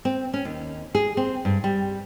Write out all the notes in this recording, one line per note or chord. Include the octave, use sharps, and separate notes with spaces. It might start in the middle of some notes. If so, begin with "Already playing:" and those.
C4
C#4
D#2
G#4
C4
G2
G3